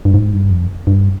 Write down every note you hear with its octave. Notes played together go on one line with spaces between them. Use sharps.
G2
G#2
G2
F2
G2